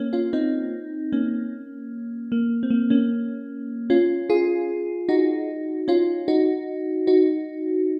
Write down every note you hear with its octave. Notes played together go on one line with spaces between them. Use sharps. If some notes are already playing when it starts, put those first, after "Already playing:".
Already playing: A#3 C#4
C#4 F4
C4 D#4
A#3 C#4
A#3
C4
A#3
A#3 C#4
C#4 F4
F4 G#4
D#4 F#4
C#4 F4
D#4 F#4
D#4 F#4